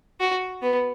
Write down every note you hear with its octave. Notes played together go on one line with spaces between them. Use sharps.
F#4
B3